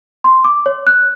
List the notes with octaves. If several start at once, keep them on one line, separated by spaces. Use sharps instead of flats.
C6
D6
C#5
F#6